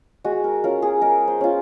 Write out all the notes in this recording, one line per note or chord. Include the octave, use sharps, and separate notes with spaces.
G#3 F#4
A#4
C#4 F4 A#4
G#4
G#3 A#4
C5
C#4 F4